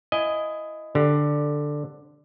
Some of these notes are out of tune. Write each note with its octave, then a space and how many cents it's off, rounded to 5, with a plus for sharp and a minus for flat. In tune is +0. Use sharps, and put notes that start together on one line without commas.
E4 +20 D#5 +0 G#5 +0
D3 +5 G4 +5